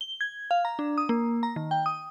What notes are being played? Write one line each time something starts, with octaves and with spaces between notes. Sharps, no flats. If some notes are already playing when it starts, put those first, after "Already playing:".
G7
G#6
F5
A#5
D4
D#6
A#3
A#5
D#3
G5
D#6